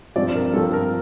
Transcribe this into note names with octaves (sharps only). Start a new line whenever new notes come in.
G2 F3 C4 D5
A#4
G2 F3 C4 A4
A#4